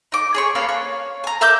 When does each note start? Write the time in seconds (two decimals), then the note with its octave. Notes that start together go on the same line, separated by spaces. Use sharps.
0.12 D#4 D6
0.34 G#4 C#5 C#6
0.55 A#3 D4 B4 F5
0.69 C#5
1.24 G#5 A#5
1.41 A#4 E5 D6 G6